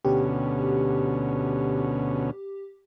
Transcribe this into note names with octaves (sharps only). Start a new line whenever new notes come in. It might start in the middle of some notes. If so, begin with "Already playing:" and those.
D2 B2 C#4 G4